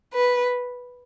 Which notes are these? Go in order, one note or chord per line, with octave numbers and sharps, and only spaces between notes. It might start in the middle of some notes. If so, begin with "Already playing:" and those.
B4